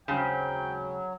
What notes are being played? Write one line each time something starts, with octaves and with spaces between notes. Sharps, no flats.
D#2 C#3 F#3 G#3 C4 G5